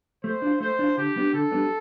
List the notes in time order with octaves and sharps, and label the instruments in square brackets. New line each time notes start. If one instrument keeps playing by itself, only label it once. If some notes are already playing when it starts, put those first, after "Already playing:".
[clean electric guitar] A3 [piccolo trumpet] C5
[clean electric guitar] D4 F4
[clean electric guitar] A3 [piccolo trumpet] C5
[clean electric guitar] D4 F4
[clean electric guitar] D3 [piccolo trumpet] G4
[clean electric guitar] G3 B3 D4
[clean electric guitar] D3 [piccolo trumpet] A4
[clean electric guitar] G3 B3 D4